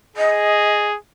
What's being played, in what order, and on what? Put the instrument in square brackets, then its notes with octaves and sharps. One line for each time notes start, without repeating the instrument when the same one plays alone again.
[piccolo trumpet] G#4 [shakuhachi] D#5